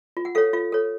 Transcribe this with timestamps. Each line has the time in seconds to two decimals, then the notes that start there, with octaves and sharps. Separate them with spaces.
0.17 F4
0.25 F#5
0.35 A4 C#5 F5
0.53 F4 F5
0.72 A4 C#5